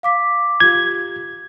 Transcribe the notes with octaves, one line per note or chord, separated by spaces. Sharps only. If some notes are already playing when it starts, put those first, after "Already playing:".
F5 D6 B6
F4 G4 G#6